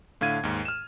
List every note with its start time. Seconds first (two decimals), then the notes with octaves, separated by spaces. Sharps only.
0.21 A2 D3 F5 G#6 D#7
0.43 D#2 G#2
0.65 F6 E7